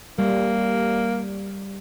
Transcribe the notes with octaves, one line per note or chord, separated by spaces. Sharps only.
G3 A#3